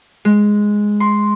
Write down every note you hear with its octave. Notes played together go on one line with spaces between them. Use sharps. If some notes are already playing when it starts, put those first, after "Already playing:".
G#3
C6